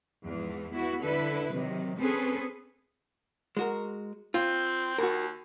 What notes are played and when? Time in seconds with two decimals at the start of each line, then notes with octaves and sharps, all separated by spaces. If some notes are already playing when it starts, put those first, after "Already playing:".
0.24 E2 G#2 E3 F3
0.73 B3 E4 F#4
1.03 D3 E4 A4 B4
1.52 C3 D#3 F#3
1.98 C4 C#4 G#4 A4 B4
3.57 G#3 F#4 A#4
4.34 C4 F4
4.98 D#2 F#4 A#4